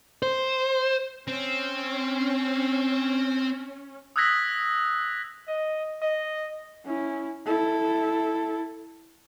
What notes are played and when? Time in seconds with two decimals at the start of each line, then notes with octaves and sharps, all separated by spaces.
0.23 C5
1.28 C4 C#4
4.16 D#6 E6 F#6 G#6 A#6 B6
5.48 D#5
6.02 D#5
6.85 C#4 E4
7.46 E4 A4